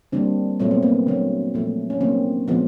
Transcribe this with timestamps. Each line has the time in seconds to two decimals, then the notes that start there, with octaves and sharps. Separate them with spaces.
0.12 D3 G3 A#3 C4 D4
0.60 A#2 F#3 A3 C4
0.71 B3
0.83 A#3 C4
1.07 D3 F#3 A3
1.54 A#2 F3 A3
1.90 C#4
2.00 D3 F#3 A#3 C4
2.48 A#2 F3 G#3 B3